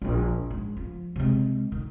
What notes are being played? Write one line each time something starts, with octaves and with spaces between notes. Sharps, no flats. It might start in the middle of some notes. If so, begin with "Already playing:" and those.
A#1 F4
G#2
F3
C3 G#3
D#3